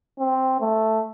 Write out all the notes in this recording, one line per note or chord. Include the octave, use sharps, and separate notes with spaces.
C4
A3